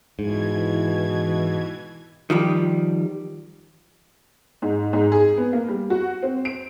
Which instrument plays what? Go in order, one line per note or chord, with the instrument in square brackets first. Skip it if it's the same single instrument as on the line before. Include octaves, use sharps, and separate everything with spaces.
[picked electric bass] G#2 [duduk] B2 [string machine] E3 G#6
[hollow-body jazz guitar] D#3 F3 G3
[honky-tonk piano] G#2
G#2
G#4
B3
A#3
G3
F#4
C4
D7